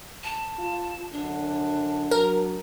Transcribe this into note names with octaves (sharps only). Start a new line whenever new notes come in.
A5
F4
F#2 D3 D4
F#3 A#4